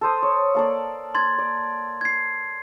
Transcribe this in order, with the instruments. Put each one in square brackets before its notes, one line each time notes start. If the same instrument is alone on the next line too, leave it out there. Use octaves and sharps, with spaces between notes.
[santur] A4 C5 D#6
C#5
A#3 A4 D5
[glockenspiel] C6 G#6 A6
[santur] D5
[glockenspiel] G#6 C7